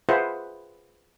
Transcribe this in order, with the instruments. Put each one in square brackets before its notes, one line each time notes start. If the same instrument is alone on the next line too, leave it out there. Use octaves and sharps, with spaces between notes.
[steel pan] F4 G#4 B4 C5 E5 F#5